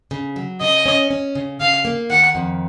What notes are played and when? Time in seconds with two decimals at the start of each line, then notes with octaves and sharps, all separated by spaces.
0.11 C#3
0.36 F#3
0.61 C#3 D#5
0.86 C#4
1.11 C#4
1.35 C#3
1.60 C#3 F5
1.85 A#3
2.10 D#3 F#5
2.35 F2